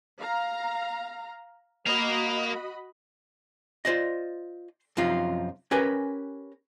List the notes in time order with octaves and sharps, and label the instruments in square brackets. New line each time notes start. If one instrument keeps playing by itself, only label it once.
[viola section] F5 A#5
[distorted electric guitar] A#3 F5 [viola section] F#4 D#5 B5
[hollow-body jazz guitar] F4 C5 D5 D#5
F#2 C3 F3 D#4 F4
C#4 G4 A#4 B4 G#5